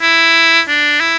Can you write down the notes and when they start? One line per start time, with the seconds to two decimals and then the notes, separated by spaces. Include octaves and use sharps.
0.02 E4
0.67 D4
1.00 E4